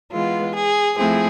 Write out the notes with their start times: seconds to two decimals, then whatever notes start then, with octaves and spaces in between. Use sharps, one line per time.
0.12 E3 G#3 B3 F4
0.54 G#4
0.97 F3 A3 C4 E4 G#4